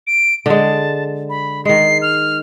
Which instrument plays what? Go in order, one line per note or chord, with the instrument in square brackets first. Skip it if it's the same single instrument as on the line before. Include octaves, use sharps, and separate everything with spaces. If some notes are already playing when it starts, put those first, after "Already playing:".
[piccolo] D7
[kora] D3 G#3 [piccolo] A5
[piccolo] B5
[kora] D#3 G#3 [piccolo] C7
[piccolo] F6